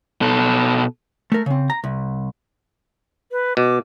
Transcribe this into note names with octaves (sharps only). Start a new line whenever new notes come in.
B2 A4
A3 A#4
C#3 C4
A#5
C2
B4
B2 D6